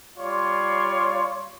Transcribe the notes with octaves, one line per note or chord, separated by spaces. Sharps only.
G3 F4 C#5 D5 C6